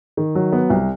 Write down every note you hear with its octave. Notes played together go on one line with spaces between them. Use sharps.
D#3
F#3
B3
C2